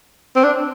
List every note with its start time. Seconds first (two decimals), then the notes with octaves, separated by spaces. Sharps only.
0.36 C4
0.44 D4